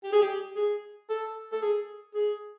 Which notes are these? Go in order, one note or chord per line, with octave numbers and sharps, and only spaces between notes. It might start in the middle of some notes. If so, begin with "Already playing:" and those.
G4
G#4
G4
G#4
A4
A4
G#4
G#4